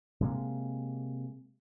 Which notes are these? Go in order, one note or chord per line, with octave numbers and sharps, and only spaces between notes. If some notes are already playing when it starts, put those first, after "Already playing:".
C3 G#3 A#3